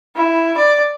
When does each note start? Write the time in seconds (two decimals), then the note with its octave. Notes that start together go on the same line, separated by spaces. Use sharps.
0.15 E4
0.57 D5